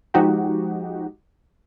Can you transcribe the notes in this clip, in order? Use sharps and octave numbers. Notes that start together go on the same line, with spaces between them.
F3 G#3 D#4 F#4 G4